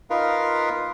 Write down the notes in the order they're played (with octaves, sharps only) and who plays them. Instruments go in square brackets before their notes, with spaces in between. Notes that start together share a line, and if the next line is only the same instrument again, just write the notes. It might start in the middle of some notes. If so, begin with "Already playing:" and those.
[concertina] D#4 F4 A#4 B4 F5